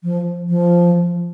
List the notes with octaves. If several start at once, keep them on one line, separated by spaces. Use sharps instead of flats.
F3
F3